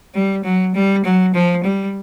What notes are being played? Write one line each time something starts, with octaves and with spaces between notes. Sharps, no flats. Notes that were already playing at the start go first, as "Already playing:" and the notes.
G3
F#3
G3
F#3
F3
G3